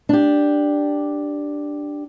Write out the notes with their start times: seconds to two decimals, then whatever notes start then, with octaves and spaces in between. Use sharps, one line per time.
0.09 D4 G4